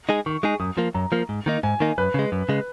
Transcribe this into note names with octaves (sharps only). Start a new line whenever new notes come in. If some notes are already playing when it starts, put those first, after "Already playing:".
G#3 D#4 G#4
D#3 C#6
G#3 D#4 G#4
F#2 D#6
F3 A#3
F#2 A#5
F3 A#3
G#2
D#3 A#3 D#4
G#2 G#5
D#3 A#3 D#4
F#2 B4
C#3 G#3
F#2
C#3 G#3